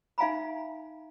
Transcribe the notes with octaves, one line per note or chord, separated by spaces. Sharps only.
D#4 E5 F5 G#5 A#5 B5